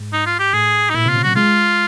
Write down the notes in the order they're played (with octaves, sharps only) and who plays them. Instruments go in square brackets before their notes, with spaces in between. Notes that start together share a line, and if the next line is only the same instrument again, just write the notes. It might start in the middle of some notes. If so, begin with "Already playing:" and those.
Already playing: [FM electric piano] G#2
[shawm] D#4
F4
G4
[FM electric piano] A2 [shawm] G#4
[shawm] D#4
[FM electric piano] A#2 [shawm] E4
[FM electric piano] C3
[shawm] F4
[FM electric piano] C#3
[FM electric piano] F#3 [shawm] F#4
[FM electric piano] G#3 [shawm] F4